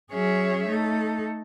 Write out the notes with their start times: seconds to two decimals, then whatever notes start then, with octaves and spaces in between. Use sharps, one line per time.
0.11 F#3 C#4 G#4 C#5 E5
0.66 A3 D#4 A4